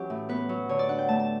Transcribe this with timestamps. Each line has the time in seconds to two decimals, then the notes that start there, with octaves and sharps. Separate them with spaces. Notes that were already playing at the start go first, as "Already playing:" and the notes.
Already playing: E3 F#3 C#4 G4
0.10 A2
0.29 B3 B4
0.49 F#3
0.69 D3 C#5
0.79 D5
0.89 D4 F#5
0.99 G5
1.09 A3 A5
1.19 A5